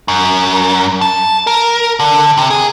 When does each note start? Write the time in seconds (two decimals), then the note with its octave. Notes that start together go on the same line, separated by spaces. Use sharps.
0.08 F#2
1.01 A5
1.47 A#4
2.00 D3
2.37 C3
2.50 G#4